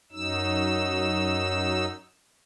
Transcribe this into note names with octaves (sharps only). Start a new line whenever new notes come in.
F#2 F#3 D#4 E6